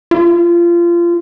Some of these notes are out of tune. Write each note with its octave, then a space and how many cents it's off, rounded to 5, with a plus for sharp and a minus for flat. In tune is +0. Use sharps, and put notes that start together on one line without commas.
F4 -25